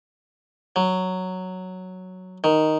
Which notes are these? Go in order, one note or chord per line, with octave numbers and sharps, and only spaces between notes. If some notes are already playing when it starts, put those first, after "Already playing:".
F#3
D#3